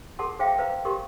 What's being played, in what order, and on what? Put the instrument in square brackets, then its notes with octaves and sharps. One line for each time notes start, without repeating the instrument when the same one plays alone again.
[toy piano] G#4 A#4 F#5 A5 C6
G#4 C5 E5 F5 G5
B4 C5 F5 A#5
G4 A#4 C6 C#6